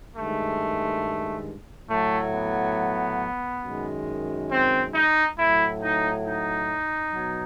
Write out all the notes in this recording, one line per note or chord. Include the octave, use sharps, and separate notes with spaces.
G2 D#3 G#3 A3
A2 F#3 A3
B3
F#2 D#3 G#3
C4
D#4
A2 F#3 E4
D#4
D#4
B2 F#3